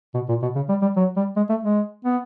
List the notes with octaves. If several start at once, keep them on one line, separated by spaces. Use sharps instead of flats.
B2
A#2
B2
C#3
G3
G3
F#3
G3
G#3
A3
G#3
B3